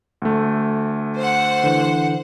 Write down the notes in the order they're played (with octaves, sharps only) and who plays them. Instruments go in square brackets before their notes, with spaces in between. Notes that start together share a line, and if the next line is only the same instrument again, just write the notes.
[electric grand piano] D2 A3
[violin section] C5 F#5
[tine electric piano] D3 E3